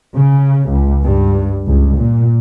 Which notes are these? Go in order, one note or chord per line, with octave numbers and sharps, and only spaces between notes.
C#3
C#2
G2
C#2
A#2